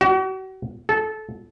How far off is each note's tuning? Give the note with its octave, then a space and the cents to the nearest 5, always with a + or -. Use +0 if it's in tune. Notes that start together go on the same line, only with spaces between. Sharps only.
F#4 +40
A4 -20